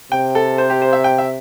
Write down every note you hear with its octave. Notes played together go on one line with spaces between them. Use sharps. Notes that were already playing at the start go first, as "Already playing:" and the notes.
C3 G5
A4
C5
G4
C5
E5
G5
E5